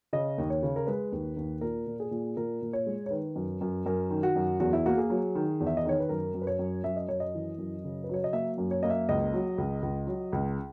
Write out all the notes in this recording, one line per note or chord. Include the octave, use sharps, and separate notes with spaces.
C#3 D#5
D#2
C#5
C#3
A#4
G#3 B4
D#2
D#2
A#2 A#4
A#2
G#4
A#2
A#2 A#4
A#2
C#5
G#3
C#5
D#3 B4
F#2
F#2
F#2 A#4
D#3
F#4
F#2
E2 F#4
E4
A#3 F#4
G#4
F#3
D#3
E2
E5
D#5
D#3 C#5
B4
F#2 A#4
F#2
B4
C#5
F#2
F#2 E5
D#5
F#2 C#5
D#5
E3
F#2
C#3
B4
F#3 C#5
D#5
A#3 E5
F#2
C#5
A#3 D#5
E5
C#2 D#5
F#3
C#2
C#2
F#3
C#2